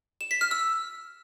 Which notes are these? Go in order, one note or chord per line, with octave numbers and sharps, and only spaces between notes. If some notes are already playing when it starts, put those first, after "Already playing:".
E7
B6
F6
E6